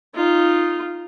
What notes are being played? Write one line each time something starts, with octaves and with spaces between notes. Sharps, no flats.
D#4 F4